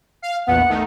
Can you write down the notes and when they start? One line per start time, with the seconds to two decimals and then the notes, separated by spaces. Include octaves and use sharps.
0.22 F5
0.47 A#1 E2 B3 F#5
0.69 D#3 A3 D#4